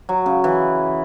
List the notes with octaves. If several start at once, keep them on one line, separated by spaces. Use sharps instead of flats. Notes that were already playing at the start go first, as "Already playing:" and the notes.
F#3
C#3
E3